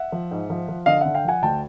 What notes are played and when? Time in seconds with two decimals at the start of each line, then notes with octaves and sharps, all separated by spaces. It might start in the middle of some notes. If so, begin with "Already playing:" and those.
Already playing: E5 F#5
0.12 F3
0.31 G#2
0.50 F3
0.69 F3
0.86 D3 D#5 F5
1.01 D3 E5 F#5
1.15 F5 G5
1.25 F3 F#5 G#5
1.42 D2 G5 A5